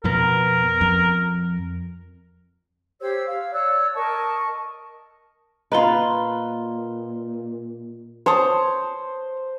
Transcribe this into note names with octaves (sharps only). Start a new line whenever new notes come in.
F2 B2 B3 A#4
F2
G4 C5 C#5 E6
F5 E6
C#5 D5 E6 F#6
A#4 D#5 A5 C#6
A#2 F4 B4 D#5 A#5 G7
C5 C#5 A5 D#6